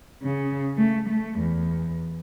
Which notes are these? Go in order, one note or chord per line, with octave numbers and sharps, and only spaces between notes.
C#3
A3
A3
E2